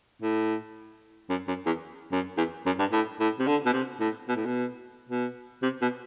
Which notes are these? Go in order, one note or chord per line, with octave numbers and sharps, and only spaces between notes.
A2
F#2
F#2
E2
F#2
E2
F#2
G2
A2
A2
C3
D3
B2
C3
A2
B2
A2
B2
B2
C3
B2